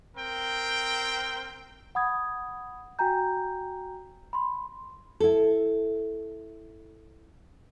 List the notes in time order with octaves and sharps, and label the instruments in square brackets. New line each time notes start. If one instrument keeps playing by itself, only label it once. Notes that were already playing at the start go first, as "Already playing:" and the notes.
[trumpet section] C4 A#4 G5
[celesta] F#5 B5 D#6 G#6
F#4 G5 G#5 A#5 G6
B5 C6
[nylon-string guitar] E4 A4